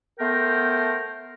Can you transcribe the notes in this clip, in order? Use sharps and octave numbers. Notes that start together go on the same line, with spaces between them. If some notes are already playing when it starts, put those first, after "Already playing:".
A3 B3 A#4 C5 G5